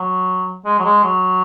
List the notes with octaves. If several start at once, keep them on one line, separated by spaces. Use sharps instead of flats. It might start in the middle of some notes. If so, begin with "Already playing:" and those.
Already playing: F#3
G#3
F#3
G#3
F#3